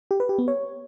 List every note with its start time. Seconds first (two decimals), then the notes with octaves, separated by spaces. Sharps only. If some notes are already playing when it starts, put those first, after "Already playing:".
0.11 G4
0.20 B4
0.29 G4
0.38 B3
0.48 C#5